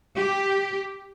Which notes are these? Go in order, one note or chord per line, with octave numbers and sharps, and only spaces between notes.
G4